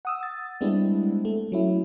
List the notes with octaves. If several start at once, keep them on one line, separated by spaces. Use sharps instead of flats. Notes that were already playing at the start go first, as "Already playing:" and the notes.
F#5 D#6 E6
A6
G3 G#3 B3 C4 D4 E4
A3
F#3 C#4 E4